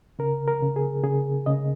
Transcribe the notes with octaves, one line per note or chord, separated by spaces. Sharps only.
C#3 A#4
A#4
C#3
G#4
C#3 G#4
C#3 D#5